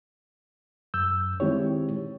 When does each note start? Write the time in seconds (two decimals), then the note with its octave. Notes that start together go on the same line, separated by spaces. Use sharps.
0.94 F#2 E6 G6
1.40 D#3 G#3 C4 E4 G4 C#5